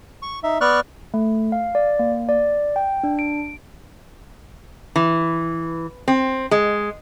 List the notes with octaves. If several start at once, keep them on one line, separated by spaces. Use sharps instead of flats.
C#6
D#4 E5
B3 D5 C#6 F6 F#6
A3
F5
D5
A#3
D5
G5
D4
D7
E3
C4
G#3